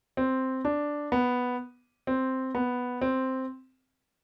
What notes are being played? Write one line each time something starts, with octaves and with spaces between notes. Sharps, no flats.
C4
D4
B3
C4
B3
C4